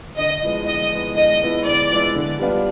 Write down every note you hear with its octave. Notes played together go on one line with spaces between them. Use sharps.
D3 D#5
F3 G#3 B3 E4
D3 D#5
F3 G#3 B3 E4
D3 D#5
F3 G#3 B3 E4
D3 D5
F3 G#3 B3 E4
D3
G3 B3 D4 F4